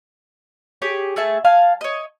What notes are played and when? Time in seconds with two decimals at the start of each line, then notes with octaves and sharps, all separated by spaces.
0.82 G4 G#4 C#5
1.16 A3 G#4 E5 A5
1.45 F5 G#5 A5
1.81 C#5 D#5